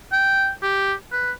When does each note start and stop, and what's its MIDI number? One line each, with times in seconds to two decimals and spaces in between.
0.12 0.51 79
0.63 0.93 67
1.12 1.32 71